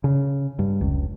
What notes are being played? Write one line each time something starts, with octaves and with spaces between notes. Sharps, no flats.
C#3
G2
F1 C#2